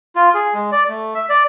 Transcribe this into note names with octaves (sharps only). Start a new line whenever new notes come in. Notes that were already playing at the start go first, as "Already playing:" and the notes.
F4
G#4
G#3
D5
A3
E5
D5